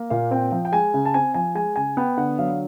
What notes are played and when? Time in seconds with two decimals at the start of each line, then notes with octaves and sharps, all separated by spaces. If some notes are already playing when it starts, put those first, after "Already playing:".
Already playing: A#3
0.10 A#2 F5
0.31 C4 G5
0.52 F3
0.65 G5
0.72 G#3 G#5
0.94 C#3
1.05 A5
1.14 C4 G#5
1.34 F3 G#5
1.55 G#3 G#5
1.76 C#3 G#5
1.97 B3 G5
2.17 D3 F#5
2.39 F#3 F5